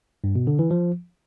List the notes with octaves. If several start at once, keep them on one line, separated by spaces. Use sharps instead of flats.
G2
B2
D3
E3
F3